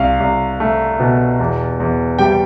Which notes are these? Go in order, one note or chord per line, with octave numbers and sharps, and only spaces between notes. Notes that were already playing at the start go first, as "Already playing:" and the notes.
Already playing: C2 F5
C2
A3
B2
E2
E2
G3 G5